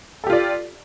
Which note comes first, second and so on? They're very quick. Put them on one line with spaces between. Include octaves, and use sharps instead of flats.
A4 G4 F4 D5